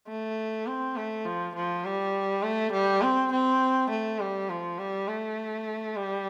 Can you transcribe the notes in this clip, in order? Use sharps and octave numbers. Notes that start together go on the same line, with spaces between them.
A3
C4
A3
F3
F3
G3
A3
G3
C4
C4
A3
G3
F3
G3
A3
G3